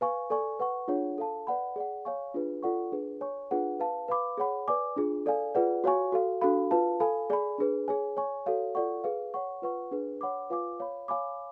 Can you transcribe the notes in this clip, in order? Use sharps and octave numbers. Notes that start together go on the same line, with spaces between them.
B4 F5 G#5 C#6
A4 D5 G#5 C#6
B4 F#5 C#6
D4 F4 G#4 C#5 F#5
A4 F5 A5
B4 D5 F#5 B5
G#4 D5 F#5
C#5 F5 G#5 C#6
D4 F4 G#4 B4
F4 A4 D5 F#5 C#6
D4 G#4 B4
C#5 G#5 C#6
D4 F4 G#4 B4 F#5
B4 F5 A5
B4 F5 B5 D6
G#4 C#5 F#5 B5
B4 D5 G#5 D6
D4 F4 G#4
A4 D5 F5 G#5
F4 G#4 B4 D5 F#5
F#4 C#5 F5 G#5 C#6
F#4 A4 F5
D4 F#4 A4 F5 B5
F4 B4 F5 A5
A4 F5 G#5 B5
G#4 D5 G#5 B5
D4 G#4 B4
G#4 C#5 G#5
C#5 G#5 C#6
F#4 A4 C#5 F5
F4 A4 D5 F#5 C#6
G#4 B4 F5
C#5 F#5 C#6
F4 B4 F#5 C#6
D4 G#4 B4
C#5 F#5 B5 D6
F4 B4 F5 G#5 D6
C#5 F5 B5
C#5 F5 G#5 B5 D6